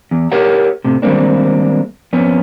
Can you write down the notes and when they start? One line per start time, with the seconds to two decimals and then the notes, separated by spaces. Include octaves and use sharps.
0.11 E2
0.32 G4 A#4 C#5 F#5
0.84 A2 C3
1.02 D#3 G3 G#3 A#3 C4 D4
2.13 F2 B3 C#4